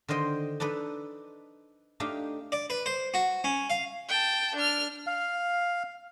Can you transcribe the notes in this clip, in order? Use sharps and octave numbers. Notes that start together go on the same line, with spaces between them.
D3 D#3 C5 D#5 G5
D4 D#4 A4 B4
A3 D4 D#4 G4 F5
D5
B4
C5
F#4
C#4
F5
G5 A5
D4 F6
F5